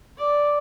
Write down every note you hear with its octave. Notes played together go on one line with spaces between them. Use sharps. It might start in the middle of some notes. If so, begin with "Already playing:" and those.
D5